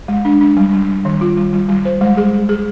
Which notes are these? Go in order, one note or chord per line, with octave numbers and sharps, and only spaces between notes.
G#3
D4
D4
G3
G3
G3
D#3
F4
G3
G3
G3
C5
G#3
G#4
G#4
G#4